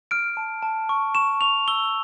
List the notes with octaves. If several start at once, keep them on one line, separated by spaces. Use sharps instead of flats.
F6 D7
A5
A5
C#6
C#6 E7
C#6 F7
E6 G7